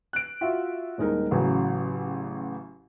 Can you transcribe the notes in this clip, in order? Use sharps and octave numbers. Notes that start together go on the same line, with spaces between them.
F#6 D7
F4 F#4 E5
D#1 G#3 D#4 A#4
A1 C#3 F#3